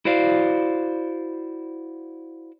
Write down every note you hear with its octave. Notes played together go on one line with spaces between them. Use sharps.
E4 F#4 C5 D5 F5